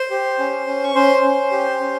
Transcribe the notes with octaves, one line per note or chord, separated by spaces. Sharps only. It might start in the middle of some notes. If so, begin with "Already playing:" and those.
Already playing: C5 C6
G4
C#4
C#4
C#6
C#4 C5 C6
C#4
G4
C#4